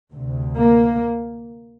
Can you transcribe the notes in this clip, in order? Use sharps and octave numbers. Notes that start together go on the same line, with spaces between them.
D2 C3
A#3